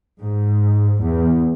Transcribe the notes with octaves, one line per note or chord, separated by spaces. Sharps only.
G#2
E2